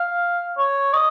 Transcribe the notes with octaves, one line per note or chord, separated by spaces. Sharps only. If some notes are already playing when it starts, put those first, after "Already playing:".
Already playing: F5
C#5
D#5